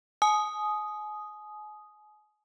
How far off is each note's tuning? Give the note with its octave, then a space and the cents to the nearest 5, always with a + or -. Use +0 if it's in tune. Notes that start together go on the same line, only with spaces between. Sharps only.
G#5 +35 D#6 +0